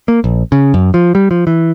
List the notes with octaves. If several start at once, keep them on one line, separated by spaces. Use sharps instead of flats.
A#3
A#1
C#3
F#2
F3
G3
F3
E3